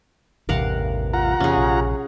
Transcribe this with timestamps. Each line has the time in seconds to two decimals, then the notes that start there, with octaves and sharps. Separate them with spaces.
0.49 A1 E2 G2 C3 A#4 F5 F#5
1.13 F4 F#5 A#5
1.40 E2 C3 C#4 G#4
1.57 A#1